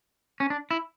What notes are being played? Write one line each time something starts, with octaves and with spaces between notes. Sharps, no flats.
C#4
D4
E4